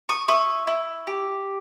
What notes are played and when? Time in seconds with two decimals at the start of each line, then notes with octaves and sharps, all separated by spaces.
0.09 C#6 D#6
0.28 E4 C#6 D#6
0.67 E4
1.07 G4